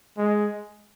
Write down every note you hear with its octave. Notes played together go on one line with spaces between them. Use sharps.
G#3